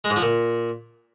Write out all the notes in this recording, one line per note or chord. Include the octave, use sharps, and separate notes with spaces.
G#3
G#2
F3
A#2